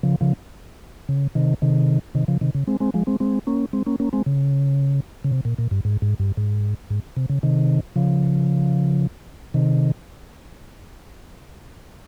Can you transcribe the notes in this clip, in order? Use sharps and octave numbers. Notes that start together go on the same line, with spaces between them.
C#3 F3
C#3 F3
C#3
C3 D#3
C3 D#3
C3 D#3
C#3 F3
C3 D#3
C#3
G#3 C4
G#3 C4
F3 G#3
G#3 C4
G#3 C4
A#3 C#4
G#3 C4
A#3 C#4
A#3 C#4
G#3 C4
C#3
C#3
C3
A#2
A#2
G2
G#2
G#2
G2
G#2
G#2
C3
C#3
C3 D#3
C#3 F3
C3 D#3